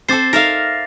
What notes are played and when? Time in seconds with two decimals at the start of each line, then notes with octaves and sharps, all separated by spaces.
0.09 C4 A4 C5 D6 A6 C7
0.33 D#4 A4 A#4 E5 F5 A#6